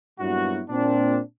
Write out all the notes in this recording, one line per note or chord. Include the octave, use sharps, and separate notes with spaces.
G2 A#2 F#3 B3 E4 F#4
A#2 C4 D4